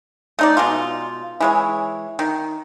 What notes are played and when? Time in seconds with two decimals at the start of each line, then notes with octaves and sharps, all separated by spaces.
0.39 A3 D#4 D5
0.57 B2 G#3 F4
1.40 E3 G#3 C#5
2.19 D#3